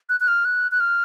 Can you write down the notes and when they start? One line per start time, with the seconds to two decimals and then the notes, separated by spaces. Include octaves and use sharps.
0.09 F#6
0.20 F#6
0.28 F6
0.45 F#6
0.71 F#6
0.80 F6